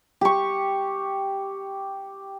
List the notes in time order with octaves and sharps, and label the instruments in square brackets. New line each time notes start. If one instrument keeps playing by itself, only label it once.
[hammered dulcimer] G4 C#6